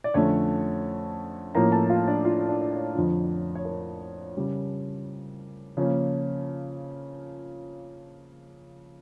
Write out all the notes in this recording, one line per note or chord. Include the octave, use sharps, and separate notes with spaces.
D5
F2 D3 A3 C#4 C#5
A2 F3 A#3 C#4 A#4 A#5
A4 A5
F4 F5
D4 D5
F4 F5
D4 D5
D5
C#5
F2 D3 F3
C#5
A#4
C#3 G3 C#4
C#3 F3 A#3 C#4 C#5